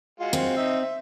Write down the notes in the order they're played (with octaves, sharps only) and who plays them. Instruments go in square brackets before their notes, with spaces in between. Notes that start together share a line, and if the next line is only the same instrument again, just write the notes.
[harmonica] G#3 F4 F#4
[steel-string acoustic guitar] C4
[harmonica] D#4 E5 E6
E5